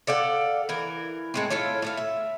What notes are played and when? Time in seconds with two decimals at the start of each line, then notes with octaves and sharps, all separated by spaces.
0.07 A4 D5 F5 F#5
0.69 E3 A#4
1.34 A2 G#3 C4
1.50 E4 F4 A4 C#5
1.82 A2 A3 F5
1.97 E5